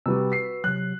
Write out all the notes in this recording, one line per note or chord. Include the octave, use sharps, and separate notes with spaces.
C3 G3 F#4 B4 E6
B6 C7
C3 F#3 F#6